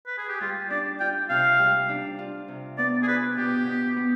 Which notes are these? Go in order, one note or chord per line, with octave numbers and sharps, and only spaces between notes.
B4
G#4
G4
G3 F4
D4 D5
F4 G5
C3 F5
G3
D4
F4
C3
B3 D5
G#4
F4 B4
B2 G4
B2
B3